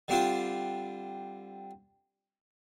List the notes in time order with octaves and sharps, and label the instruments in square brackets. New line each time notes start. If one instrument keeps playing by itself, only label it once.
[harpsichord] D3 G3 C4 D4 F4 C5